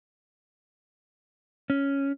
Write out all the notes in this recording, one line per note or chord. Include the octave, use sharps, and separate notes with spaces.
C#4